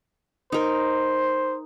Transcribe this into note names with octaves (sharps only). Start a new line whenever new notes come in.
D#4 A#4 C5